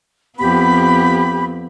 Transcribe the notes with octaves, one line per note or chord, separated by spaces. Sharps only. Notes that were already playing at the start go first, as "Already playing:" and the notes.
F2 B3 G4 B5